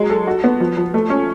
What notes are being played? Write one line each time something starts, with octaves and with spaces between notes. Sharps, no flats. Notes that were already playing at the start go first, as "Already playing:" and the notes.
Already playing: F#3 G#3
A4
F#4
B3
F3
F3
A3
C#4